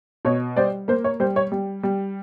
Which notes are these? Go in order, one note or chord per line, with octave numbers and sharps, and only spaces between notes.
B2 C#5
G3 C5 D5
A#3 C5
C#5
G3 C5
C#5
G3
G3